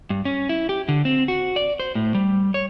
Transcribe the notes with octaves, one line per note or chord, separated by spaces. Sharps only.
G2
C#4
E4
G4
D3
C4
F#4
D5
C5
A2
G3
C#5